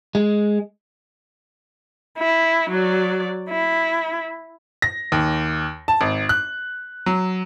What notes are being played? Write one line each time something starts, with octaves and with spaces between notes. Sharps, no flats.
G#3
E4
F#3 D5
E4
A#6
D#2
A5
G#1
F#6
F#3